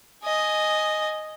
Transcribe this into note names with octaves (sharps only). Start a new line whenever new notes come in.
D#5 G#5